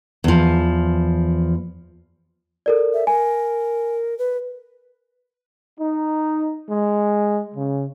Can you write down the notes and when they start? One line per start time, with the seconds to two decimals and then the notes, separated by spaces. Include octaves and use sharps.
0.24 E2 F3
2.66 A4 A#4 D5
2.94 E5
3.07 A#4 G#5
4.19 B4
5.79 D#4
6.70 G#3
7.55 C#3